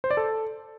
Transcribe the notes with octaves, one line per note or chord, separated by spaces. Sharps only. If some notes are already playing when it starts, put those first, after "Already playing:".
C5
D5
A4